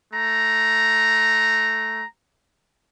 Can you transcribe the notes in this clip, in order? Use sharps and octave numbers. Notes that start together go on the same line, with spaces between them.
A3 A#5